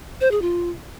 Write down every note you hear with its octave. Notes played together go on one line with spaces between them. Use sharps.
C5
G#4
F4